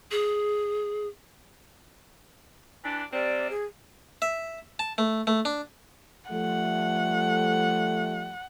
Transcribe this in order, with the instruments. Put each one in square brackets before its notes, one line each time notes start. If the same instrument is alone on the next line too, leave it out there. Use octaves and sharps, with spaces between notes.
[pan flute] G#4
[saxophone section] E3 D4
[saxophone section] C3 G3 C4 [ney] D5
[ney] G#4
[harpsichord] E5
A5
A3
A3
D4
[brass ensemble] F3 G3 A3 [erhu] F#5